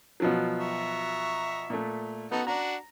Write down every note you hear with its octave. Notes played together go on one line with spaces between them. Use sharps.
B2 F3 F#3
E5 A#5 C#6
A#2 A3
B3 D#4 F#4 A4
D4 F#4 A#5